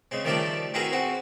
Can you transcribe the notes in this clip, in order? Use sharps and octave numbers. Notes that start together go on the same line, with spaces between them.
C#3 G#3 C4
D#3 F3 G3 A3 A#4 D5
C4 E4 F#4 G#4 A#4 B4
C4 F#4